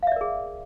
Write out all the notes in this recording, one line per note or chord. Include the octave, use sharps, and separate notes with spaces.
G#4 A#4 D5 E5 F5